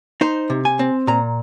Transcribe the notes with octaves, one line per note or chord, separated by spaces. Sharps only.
D#4 C5
C3
G#5
C4
A#2 A#5